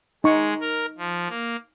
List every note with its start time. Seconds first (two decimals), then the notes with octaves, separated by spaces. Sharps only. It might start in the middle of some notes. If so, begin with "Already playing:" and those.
0.24 G#3 D#4 C#6
0.60 A#4
0.98 F3
1.29 A#3